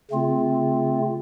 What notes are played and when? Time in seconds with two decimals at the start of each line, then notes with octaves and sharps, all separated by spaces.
0.11 C#3 A3 C4 F4